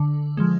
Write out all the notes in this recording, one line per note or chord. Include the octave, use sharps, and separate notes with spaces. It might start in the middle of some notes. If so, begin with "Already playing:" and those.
Already playing: D3
F3 G#3